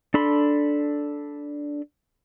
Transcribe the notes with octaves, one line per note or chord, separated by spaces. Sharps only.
D4 A4 B5 C6